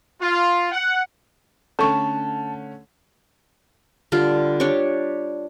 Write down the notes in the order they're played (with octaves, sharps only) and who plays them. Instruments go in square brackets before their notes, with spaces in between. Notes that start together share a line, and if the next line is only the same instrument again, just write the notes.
[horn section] F4
F#5
[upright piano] D3 A3 C#4 [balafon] A4 C#6 [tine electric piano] A5
[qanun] D3 G3 F4
D4 G4 C#5 C#6